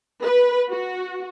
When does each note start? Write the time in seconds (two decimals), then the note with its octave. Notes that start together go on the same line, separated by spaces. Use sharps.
0.23 B4
0.70 F#4